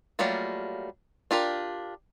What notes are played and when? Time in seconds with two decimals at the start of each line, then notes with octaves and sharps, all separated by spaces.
0.19 F#3 G3 A3 A#3 F4
1.31 D4 F4 G4 A#4